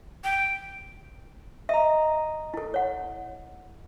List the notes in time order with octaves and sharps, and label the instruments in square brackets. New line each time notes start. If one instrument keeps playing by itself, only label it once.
[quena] G5
[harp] D#5 A#5 [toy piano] E5
[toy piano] E4 A4
C#5 F#5